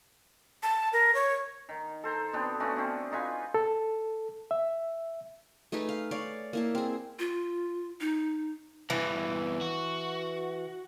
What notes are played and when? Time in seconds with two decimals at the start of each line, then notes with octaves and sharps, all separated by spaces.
0.63 A5
0.93 A#4
1.15 C#5
1.69 D#3
2.04 A4 C5 A#5
2.33 B2 B3 C4 D4
2.60 A3 C#4 D4 F#4
2.76 D3 C4
3.12 D#4 F4 B4 G#5
3.54 A4
4.51 E5
5.72 A3 D#4 G#4 B4
5.89 F5
6.11 C#5 D5 F5
6.53 A#3 E4 A5
6.75 C4 G#4
7.19 F4
8.00 D#4
8.90 E2 G2 E3
9.61 F#4